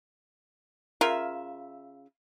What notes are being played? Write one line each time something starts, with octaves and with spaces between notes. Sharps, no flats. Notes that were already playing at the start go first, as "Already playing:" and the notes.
C#3 F4 A#4 E5